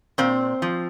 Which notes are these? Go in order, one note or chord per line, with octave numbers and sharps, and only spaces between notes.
A#2 C4
F3